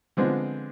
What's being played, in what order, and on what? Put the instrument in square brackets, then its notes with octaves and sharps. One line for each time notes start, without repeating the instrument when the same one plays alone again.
[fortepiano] D3 F3 G#3 B3 C4